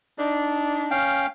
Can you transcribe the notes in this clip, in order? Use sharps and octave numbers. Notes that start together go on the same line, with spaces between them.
D4 D#4
C#4 F5 G5